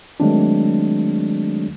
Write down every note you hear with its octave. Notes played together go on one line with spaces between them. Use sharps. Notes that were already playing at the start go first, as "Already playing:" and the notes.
D#3 F#3 G#3 A3 C4 D4